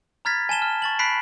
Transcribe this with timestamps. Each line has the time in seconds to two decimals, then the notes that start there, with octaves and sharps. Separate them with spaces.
0.25 A#5 B5 F6 G#6 A6 B6
0.49 G#5 A5 E7 G7
0.62 F6
0.82 C#6 A6 F#7
0.99 B5 F#6 B6 C7 D7